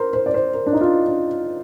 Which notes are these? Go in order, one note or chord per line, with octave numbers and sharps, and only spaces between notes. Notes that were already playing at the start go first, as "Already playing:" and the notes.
Already playing: A#4 C5
C5
D5
C5
A#4
D4
D#4
F4
D4